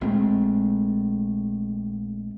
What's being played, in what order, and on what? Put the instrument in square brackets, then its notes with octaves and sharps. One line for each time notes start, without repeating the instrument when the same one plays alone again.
[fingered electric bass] A#1 G#3 A3 C4